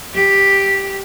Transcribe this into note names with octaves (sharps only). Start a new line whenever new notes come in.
G4